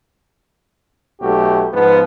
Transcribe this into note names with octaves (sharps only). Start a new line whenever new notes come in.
B1 A3 F#4 G4
G#2 F3 B3